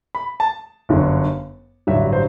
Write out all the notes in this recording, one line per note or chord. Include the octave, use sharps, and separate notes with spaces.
B5
A5
G1 F#2 D3
A1 G2 D3 F#3 E5
C5